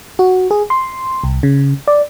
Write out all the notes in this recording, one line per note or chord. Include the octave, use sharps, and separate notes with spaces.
F#4
G#4
C6
C2
C#3
D5